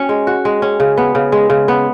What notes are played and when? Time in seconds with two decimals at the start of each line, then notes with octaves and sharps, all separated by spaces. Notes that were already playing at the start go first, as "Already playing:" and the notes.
Already playing: C#4 F#4
0.09 G#3
0.27 F#4
0.45 G#3
0.62 C#4
0.80 C#3
0.97 B3
1.15 C#3
1.32 G#3
1.50 C#3
1.68 B3